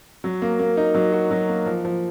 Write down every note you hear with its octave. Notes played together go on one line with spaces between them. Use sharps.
F#3
A#3
A#3
D#4
F#3
F#4
F#3
A#3
F3
F3